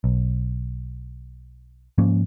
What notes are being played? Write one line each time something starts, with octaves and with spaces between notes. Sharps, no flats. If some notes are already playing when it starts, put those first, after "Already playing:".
B1
G#2 F3 A#3 C#4